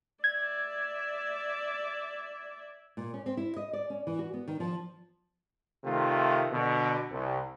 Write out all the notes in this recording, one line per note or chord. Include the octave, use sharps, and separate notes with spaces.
D5 E5 G#6
A#2
C#4
C4
E4
D#5
D5
C#4
E3
F#4
B3
D#3
F3
C3 D#3 A3 F4
B2 D3
C2